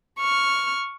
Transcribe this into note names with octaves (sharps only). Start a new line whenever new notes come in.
C#6 F6